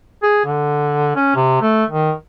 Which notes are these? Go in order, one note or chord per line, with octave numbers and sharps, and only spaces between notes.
G#4
D3
C#4
C3
A3
D#3